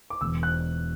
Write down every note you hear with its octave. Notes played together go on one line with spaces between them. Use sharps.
D6
E1 E6
F#6